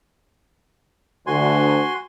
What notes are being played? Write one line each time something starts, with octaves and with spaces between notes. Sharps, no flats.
D2 F#4 G#5 C6